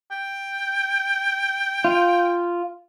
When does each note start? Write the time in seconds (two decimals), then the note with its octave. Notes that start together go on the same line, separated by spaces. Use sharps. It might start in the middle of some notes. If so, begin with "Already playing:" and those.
0.11 G5
1.85 F4